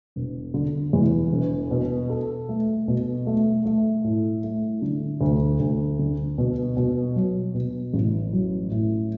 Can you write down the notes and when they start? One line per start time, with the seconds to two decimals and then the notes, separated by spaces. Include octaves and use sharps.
0.16 E1
0.54 D3
0.93 E2
1.32 E1
1.71 B2
2.10 A4
2.49 A3
2.88 B2
3.27 A3
3.65 A3
4.04 A2
4.44 A3
4.82 D3
5.21 D2
5.60 D2
5.99 D3
6.38 B2
6.77 B2
7.16 F#3
7.55 B2
7.93 A1
8.33 F#3
8.71 A2